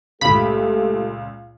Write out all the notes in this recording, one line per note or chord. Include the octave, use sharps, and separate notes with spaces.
C#2 A#2 A3 G4 A4 B5